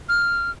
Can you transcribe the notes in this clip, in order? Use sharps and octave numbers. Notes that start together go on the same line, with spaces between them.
F6